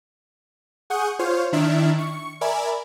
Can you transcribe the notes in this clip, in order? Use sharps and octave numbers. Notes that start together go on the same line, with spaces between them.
G#4 F#5 C#6 D#6 G6
F4 C5 C#5 F6
D#3 D4 E4 E5 F6
C#6
A#4 D5 E5 G#5 B5